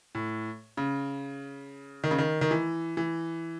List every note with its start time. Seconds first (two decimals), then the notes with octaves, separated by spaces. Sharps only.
0.15 A2
0.77 C#3
2.04 D#3
2.11 C#3
2.18 D#3
2.41 D#3
2.51 E3
2.97 E3